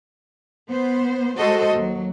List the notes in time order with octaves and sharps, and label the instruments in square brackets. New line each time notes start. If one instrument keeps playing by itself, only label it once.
[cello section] B3 C5
G#3 F#4 A4 C5 D#5
D#2 F#3